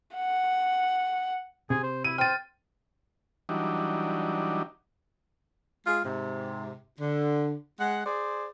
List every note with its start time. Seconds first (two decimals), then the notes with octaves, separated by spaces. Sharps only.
0.16 F#5
1.70 C3 G#4
1.83 C5
2.04 E4 D#7
2.18 C5 G5 F6 A6 D#7
3.49 E3 F#3 G3 D4 D#4
5.86 G#3 F4 G#4
6.04 G#2 C3
7.00 D3
7.80 G#3 F#5
8.06 G#4 C5 D5